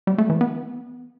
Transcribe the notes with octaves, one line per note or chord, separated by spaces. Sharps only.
G3
A3
E3
B3